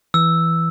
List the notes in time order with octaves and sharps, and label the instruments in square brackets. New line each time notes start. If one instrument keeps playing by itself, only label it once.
[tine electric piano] E3 [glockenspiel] E6